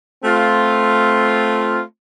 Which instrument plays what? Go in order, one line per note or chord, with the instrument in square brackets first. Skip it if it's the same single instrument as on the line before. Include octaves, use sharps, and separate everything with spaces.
[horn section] A3 C4 F4